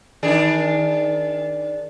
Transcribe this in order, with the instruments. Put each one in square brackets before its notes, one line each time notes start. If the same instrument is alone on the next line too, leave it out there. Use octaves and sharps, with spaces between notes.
[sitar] D#3 D4 G#4